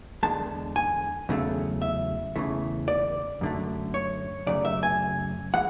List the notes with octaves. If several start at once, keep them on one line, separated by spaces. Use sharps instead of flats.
E2 D3 G#3 A5
G#5
E2 C#3 F#3 A3
E5
E2 C#3 E3 A3
D5
F#2 D3 A3
C#5
F#2 C#3 F#3 A3 D5
E5
G#5
E3 G#3 F#5